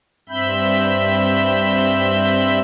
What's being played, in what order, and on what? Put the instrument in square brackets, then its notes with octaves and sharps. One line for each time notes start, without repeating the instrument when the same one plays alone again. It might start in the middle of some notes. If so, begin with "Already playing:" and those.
[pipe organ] G2 C4 E5 B5 G6